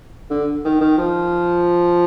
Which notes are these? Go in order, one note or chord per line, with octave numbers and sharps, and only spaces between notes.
D3
D#3
D#3
F3